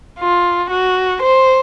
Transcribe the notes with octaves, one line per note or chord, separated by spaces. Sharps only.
F4
F#4
C5